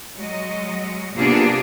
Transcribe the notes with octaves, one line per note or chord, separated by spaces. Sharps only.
F#3 G#3 D#5
C3 A#3 B3 D4 F4 G#4